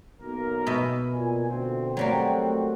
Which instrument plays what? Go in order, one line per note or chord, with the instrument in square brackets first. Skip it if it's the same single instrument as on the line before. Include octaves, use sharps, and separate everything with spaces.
[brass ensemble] B1 A#3 A#4
[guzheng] B2 D#5 E5
[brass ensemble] A#2 G#5
D2 C4
[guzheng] F#3 G3 A#3 [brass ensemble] A3 C4 F#4